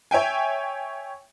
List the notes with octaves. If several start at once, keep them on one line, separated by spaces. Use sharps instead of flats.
C#5 E5 G5 G#5